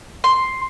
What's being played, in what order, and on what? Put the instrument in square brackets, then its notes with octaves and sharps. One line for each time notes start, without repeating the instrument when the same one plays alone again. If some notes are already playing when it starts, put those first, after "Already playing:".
[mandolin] C6